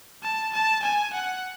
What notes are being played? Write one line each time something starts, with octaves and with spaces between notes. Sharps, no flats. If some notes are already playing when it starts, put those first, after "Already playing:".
A5
A5
G#5
F#5